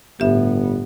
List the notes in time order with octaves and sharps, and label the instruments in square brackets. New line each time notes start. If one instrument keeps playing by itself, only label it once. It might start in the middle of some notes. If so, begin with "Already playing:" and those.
[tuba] G1 [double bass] A2 B3 [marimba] G4 E5